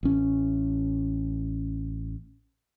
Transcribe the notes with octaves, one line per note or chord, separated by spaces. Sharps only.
A1 C#4